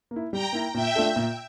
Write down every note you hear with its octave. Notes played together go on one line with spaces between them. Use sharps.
A#3
E4
G3 G5 A#5
A#3 E4
A#2 E5 G5
A3 D4 F4 A4
A#2